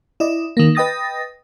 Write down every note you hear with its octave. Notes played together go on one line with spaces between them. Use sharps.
E4 D5 D#5
D#3 A#3
B4 D#5 G5 D#6 A6 A#6